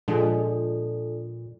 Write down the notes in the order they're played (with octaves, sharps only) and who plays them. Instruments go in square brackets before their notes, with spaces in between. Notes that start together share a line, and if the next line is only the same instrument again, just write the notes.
[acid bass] A#2 [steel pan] F3 G#3 [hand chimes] D4 A4